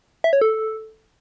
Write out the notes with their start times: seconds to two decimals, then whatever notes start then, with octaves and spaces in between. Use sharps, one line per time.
0.24 E5
0.33 C#5
0.41 A4